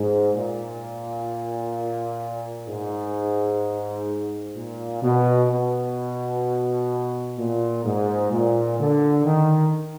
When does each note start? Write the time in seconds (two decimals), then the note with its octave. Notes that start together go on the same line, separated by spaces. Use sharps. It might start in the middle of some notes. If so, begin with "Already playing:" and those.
Already playing: G#2
0.34 A#2
2.68 G#2
4.56 A#2
5.02 B2
5.50 B2
7.38 A#2
7.85 G#2
8.31 A#2
8.79 D3
9.25 D#3